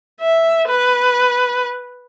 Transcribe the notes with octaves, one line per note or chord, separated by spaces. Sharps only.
E5
B4